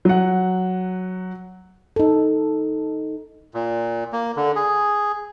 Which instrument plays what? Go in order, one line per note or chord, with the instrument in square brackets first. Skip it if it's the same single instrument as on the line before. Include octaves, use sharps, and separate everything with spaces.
[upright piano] F#3 F#5
[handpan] D#4 A4
[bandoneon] A#2
A#3
D3
G#4